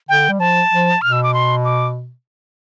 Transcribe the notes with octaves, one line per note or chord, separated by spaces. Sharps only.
D3 G5
G3
F3 A5
F3
B2 F6
E6
D6
C6
D6